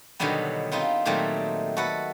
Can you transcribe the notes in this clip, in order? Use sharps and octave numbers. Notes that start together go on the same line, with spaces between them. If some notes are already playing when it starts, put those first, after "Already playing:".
B2 D3 D#3 F#3 G3 B3
B3 C4 D#4 F4
A#2 D#3 F#3 G3 A3 C4
F#4 A4 B4 F#5